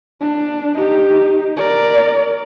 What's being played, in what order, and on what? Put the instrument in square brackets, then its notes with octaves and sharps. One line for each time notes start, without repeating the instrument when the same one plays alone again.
[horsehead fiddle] D4
D#4 G4
A#4 D5